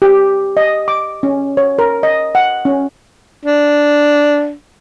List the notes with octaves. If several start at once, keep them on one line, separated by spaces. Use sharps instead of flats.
G4
D#5
D6
C#4
C#5
A#4
D#5
F#5
C#4
D4